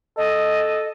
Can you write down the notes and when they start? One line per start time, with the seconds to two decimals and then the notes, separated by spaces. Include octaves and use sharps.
0.17 A4 D#5